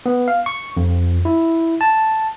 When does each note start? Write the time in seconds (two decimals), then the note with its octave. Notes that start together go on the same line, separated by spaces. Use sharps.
0.06 B3
0.28 F5
0.46 C#6
0.77 F2
1.25 E4
1.81 A5